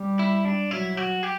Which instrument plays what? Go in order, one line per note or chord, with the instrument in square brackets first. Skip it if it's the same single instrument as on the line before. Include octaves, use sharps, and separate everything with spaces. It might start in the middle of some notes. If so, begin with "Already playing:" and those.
Already playing: [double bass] G3
[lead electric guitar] E4
D4
[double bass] F#3 [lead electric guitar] E4
[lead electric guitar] F#4
G4